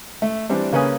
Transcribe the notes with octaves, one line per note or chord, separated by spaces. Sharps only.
A3
E3 G3 C4 D4
C#3 A#3 C#4 B4 G#5 D#6